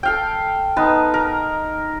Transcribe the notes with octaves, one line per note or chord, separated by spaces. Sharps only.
A4 F5 G5
B3 D#4 B4 A5
A#4